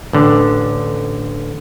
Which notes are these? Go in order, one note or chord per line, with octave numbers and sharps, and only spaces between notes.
A1 D3